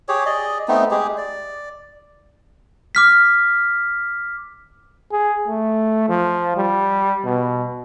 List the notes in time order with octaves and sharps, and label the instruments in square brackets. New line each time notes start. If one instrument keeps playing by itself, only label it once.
[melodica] G4 G#4 C#5
G#4 D5 D#5
A3 B3 C4 D#4
G#3 G4 G#4
D5
[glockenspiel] D6 F6 B6
[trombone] G#4
A3
F3
G3
B2